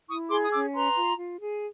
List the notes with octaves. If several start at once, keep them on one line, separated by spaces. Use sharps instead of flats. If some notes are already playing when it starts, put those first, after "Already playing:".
E4 C#6 D#6
G#4 C6 D6
D#6
C#4 D6 E6
B4 A#5 C6
F4
F4
G#4